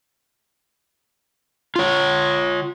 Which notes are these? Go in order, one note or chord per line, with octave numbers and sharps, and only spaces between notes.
F4 C#5